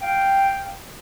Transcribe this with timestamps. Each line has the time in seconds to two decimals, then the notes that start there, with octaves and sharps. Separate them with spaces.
0.01 F5 G5